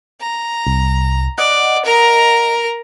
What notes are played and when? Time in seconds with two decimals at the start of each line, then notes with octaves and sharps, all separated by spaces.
0.21 A#5
0.67 C2
1.38 D5 D#5 F#5
1.85 A#4 A#5